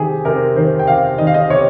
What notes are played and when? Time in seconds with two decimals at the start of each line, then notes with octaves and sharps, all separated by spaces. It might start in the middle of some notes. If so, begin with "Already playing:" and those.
Already playing: C3 D#3 G4 G#4
0.25 C3 A#4
0.56 D#3 C5
0.79 G5
0.87 C3 F5
1.18 D#3 D#5
1.27 F5
1.34 D#5
1.50 C3 C#5